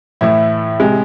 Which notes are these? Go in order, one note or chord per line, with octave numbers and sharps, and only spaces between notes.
A2 E3 A3 E4
C3 G#3